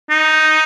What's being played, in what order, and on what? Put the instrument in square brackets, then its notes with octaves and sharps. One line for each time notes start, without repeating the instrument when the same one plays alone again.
[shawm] D#4